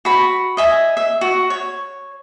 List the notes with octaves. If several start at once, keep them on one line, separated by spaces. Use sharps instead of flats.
F#4 B5
D#5 E5 G#5
E5
F#4
C#5